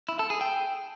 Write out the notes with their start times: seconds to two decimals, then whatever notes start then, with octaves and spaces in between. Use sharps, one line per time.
0.09 E4
0.19 A4
0.30 G#4
0.41 G5